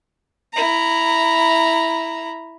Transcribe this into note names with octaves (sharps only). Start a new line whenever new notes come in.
E4 A#5